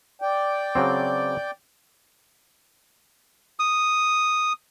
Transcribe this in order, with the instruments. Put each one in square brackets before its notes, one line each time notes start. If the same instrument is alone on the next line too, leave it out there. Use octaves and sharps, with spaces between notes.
[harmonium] D5 G5
[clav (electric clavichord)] C#3 F#3 C4
[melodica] D#6